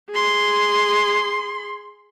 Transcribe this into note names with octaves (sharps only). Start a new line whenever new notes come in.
G#4 C6